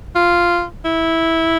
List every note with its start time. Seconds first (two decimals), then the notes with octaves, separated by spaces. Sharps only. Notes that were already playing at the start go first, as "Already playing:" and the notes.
0.15 F4
0.85 E4